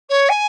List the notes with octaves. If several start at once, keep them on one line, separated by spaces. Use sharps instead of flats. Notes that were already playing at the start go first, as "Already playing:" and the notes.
C#5
G#5